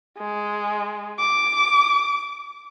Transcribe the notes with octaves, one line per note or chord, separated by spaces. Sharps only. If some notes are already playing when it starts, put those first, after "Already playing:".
G#3
D6